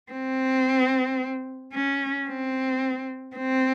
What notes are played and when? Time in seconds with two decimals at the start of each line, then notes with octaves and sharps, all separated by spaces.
0.12 C4
1.74 C#4
2.28 C4
3.36 C4